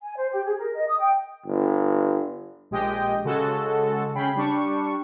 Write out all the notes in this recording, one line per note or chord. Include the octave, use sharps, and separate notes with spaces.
G#5
C5
G4
G#4
A#4
D#5
D#6
G5
G1
A#1 G#3 G4 D#5 G5
C#3 G#3 F#4 A4
C#3 C#4 G5 B5 C7
G3 D4 C#6